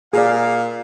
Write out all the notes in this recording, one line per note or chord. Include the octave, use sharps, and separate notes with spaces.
A#2 G#4 D5 F5